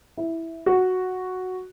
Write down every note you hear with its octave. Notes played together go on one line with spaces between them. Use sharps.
E4
F#4